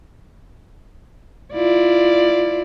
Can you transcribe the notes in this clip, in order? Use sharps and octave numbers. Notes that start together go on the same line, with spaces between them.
E4 F4 D5